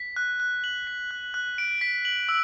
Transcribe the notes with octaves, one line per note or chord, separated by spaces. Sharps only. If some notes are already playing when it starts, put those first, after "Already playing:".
Already playing: B6
F#6
F#6
F#7
B6
F#6
F#6
D7
B6
F#7
E6